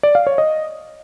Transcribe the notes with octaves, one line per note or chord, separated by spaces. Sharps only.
D5
F5
C#5
D#5